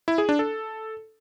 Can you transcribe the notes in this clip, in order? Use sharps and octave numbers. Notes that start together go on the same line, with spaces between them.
E4
G#4
D4
A4